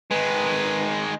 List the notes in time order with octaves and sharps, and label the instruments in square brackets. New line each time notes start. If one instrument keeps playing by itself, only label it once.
[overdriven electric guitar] D#3 G#3 [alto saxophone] B4